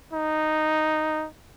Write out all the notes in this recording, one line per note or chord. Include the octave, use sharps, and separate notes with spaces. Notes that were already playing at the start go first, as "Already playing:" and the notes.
D#4